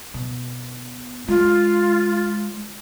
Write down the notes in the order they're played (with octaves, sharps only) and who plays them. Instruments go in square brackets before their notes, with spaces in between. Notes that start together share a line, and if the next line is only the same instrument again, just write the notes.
[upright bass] B2
[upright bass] G#3 [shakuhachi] F4